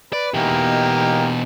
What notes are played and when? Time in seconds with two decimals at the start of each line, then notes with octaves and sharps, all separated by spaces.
0.13 B4 D5
0.34 B2 E3 A#3 D#4 G4